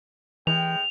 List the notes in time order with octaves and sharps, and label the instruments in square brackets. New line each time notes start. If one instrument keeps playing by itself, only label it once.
[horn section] A2 G#3 G5 [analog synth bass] E3 [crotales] F7